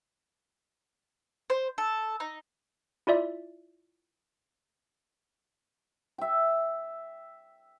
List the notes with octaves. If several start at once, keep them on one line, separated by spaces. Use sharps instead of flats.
C5
A4
D#4
E4 F4 D5 E5
E5 G5